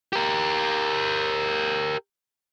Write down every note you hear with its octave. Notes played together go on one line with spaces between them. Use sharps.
G4 A#4